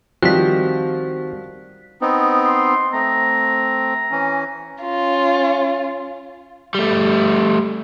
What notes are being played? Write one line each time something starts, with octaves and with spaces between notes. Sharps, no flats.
D#3 F3 G3 C4 F#4 F#6 B6
B3 C4 D#4
C6
A3 C4 A#5
E3 C#4
C#4 F4
G3 A3